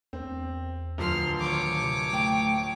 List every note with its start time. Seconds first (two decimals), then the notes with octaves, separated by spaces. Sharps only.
0.13 E2 C4
0.98 D1 F3 C6 F6
1.39 D#3 C#5 D6
1.81 C3
2.13 A3 G5